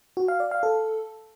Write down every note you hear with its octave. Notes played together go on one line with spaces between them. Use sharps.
F#4
F5
D5
F5
A4